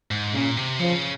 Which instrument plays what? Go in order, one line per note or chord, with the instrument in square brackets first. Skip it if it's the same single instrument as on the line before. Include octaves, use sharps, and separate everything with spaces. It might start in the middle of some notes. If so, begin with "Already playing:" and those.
[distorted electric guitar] G#2
[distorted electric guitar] A#2 [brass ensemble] C#3
[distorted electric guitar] C3
[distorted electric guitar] C#3 [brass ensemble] F3